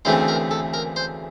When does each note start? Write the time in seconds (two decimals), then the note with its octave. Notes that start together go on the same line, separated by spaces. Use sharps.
0.05 D2 C#3 E3 A3 C4 C5
0.28 A#4
0.51 A4
0.74 A#4
0.96 C5